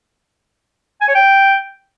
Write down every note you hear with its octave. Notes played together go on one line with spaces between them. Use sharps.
G#5
C#5
G5